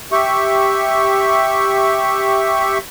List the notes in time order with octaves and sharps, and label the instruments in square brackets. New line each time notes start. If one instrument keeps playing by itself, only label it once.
[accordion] G4 E5 C#6